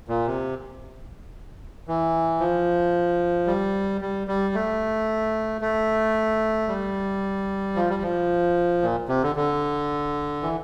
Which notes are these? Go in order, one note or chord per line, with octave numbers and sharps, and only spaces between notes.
A#2
C3
E3
F3
G3
G3
G3
A3
A3
G3
F3
G3
F3
A#2
C3
D3
D3
E3